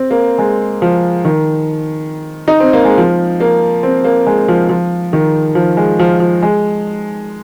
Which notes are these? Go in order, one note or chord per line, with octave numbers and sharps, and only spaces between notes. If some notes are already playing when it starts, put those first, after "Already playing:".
Already playing: C4
A#3
G#3
F3
D#3
D#4
C4
A#3
G#3
F3
A#3
C4
A#3
G#3
F3
F3
D#3
F3
G#3
F3
F3
G#3